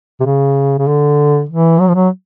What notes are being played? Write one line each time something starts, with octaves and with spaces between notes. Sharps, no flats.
C3
C#3
C#3
D3
E3
F#3
F3
F#3